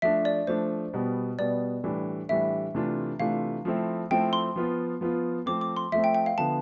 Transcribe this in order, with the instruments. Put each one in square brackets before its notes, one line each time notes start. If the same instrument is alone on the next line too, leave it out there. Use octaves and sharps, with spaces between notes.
[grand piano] F3 A3 D4 [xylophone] E5
[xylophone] D5
[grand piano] F3 A3 D4 [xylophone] C5
[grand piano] B2 G3 B3
[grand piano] B2 G3 B3 [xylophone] D5
[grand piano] A2 E3 G3 D4
[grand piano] A2 E3 G3 D4 [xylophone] E5
[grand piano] C3 E3 A3 D4 F4
[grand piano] C3 E3 A3 D4 F4 [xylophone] F5
[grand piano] F3 A3 C4 E4
[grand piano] F3 A3 C4 E4 [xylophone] G5
[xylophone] C6
[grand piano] F3 B3 F4
F3 B3 F4
[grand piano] F3 A3 C4 [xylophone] D6
[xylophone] D6
C6
[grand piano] F3 A3 C4 [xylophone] E5
[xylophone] G5
G5
F5
[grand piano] D3 F3 B3 [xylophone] A5